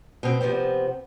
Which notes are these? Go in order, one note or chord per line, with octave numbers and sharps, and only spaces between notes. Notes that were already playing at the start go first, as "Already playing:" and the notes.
B2 C4
C3 F3 B3 C4